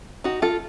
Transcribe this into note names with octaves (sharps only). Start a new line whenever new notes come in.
D#4 F#4
F4 A4